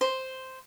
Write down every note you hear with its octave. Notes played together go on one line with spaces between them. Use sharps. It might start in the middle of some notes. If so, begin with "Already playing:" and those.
C5